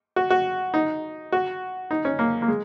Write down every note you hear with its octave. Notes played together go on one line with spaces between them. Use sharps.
F#4
F#4
D#4
F#4
D#4
C#4
A#3
A#3
G#3